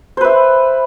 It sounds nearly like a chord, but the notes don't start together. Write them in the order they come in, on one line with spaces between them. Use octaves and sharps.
C5 B4 E5